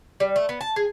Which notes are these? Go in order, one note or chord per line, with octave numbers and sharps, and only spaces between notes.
G3
A3
B3
A5
G#4